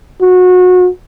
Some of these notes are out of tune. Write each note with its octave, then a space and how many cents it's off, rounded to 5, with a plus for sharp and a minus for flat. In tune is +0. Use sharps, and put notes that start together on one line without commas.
F#4 -25